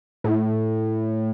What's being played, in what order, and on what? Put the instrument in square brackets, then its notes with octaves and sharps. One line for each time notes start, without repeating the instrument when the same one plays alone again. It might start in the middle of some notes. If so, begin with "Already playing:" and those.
[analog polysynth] A2